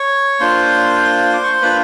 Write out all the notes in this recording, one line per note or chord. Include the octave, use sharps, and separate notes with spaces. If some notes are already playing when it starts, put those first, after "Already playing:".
Already playing: C#5 C#6
A#3 D4 F4 C5 C6
D6
C#6
C6
A#3 D4 F4 B4 B5